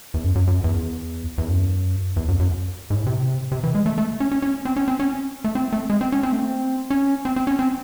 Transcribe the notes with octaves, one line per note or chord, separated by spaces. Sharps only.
E2
F#2
F#2
F#2
E2
E2
F#2
E2
F#2
F#2
G#2
A2
C3
C3
E3
G#3
A3
A3
C#4
C#4
C#4
C4
C#4
C4
C#4
A3
C4
A3
G#3
C4
C#4
C4
A3
C4
C#4
C4
C4
C#4
C4